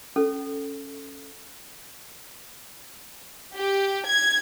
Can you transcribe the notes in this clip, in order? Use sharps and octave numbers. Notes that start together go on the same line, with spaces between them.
C#4 A4
G4
G#6